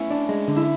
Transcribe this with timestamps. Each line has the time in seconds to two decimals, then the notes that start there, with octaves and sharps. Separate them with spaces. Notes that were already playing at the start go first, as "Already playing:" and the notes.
Already playing: A3 B3 C#4 E4
0.10 D4
0.29 G#3
0.48 D3
0.56 E4